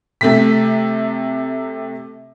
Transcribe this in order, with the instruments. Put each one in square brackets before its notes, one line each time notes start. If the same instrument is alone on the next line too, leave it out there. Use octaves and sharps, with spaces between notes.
[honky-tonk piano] C3 A3 B6